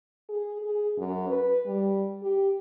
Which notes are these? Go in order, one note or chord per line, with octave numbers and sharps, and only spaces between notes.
G#4
G#4
F#2
B4
G3
G4